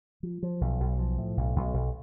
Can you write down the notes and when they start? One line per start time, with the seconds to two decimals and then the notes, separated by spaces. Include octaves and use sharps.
0.23 F3
0.43 F3
0.61 B1
0.80 B1
0.99 F3
1.18 A2
1.37 B1
1.56 B1
1.74 B1